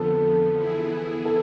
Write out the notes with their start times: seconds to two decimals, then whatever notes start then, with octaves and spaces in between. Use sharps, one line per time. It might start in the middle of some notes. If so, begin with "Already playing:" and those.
Already playing: F2 D3 F3 B3 A4
0.56 E3 B3 E4 G#4
1.25 A4